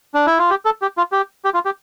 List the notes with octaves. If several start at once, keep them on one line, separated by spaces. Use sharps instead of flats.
D4
E4
F4
G4
A4
G4
F4
G4
G4
F4
G4